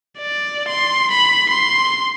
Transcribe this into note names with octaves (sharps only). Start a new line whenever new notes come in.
D5
C6
B5
C6